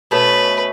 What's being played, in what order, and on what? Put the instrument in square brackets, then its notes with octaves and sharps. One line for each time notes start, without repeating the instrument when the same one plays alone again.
[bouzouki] B2 A3 C#4 [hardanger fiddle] B4